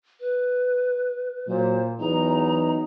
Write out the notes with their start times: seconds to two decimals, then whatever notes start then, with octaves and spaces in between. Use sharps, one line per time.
0.20 B4
1.48 A#2 F#3 C5
2.00 E2 F#3 D#4 A#5